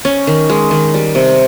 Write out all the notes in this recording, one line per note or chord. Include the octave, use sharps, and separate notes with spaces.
C#4
D#3
G#3
D#3
G3
C3